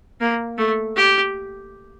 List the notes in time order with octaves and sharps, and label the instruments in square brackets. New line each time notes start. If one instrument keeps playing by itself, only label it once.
[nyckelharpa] A#3
A3
G4